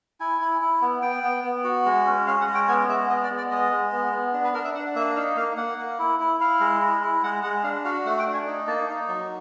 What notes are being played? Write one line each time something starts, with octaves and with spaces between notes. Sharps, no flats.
E4 G#5
E4
E4
B3
B3 G5
B3
B3
F#4
G#3
C#4
C#4 F5
F#5
G#3
G5
B3 G#5
G#3 E5
B3 D#5
D5
B3
D5
G#3 D#5
G#3
B3
B3
D4
B4
D4 A#4
E5
D4 F#5
A#3 E5
D#4 F5
A#3 F5
A#3 F#5
A#3
E4
E4
E4 F5
G#3
E4
E4
G#3 F#5
G#3 F#5
D4 F5
F#4 F5
A3 F#5
G5
D4
G#5
D#4
A#3 A5
D#4
F#3